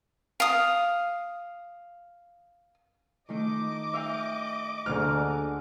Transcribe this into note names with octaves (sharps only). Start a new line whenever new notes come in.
F5 D#6
D#3 A3 D#4 D#5 D6
E5 F5 G5
D2 D3 A#3 G#4 F6